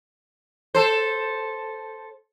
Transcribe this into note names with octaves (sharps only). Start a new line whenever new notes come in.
A4 C5